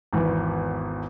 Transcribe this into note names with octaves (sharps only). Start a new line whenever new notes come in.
G#1 E2 E3